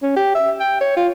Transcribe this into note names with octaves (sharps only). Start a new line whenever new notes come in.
C#4
G4
E5
G5
C#5
F4